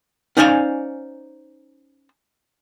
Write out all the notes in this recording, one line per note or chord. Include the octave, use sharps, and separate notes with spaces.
C#4 D#4 C5 D5 F5 G#5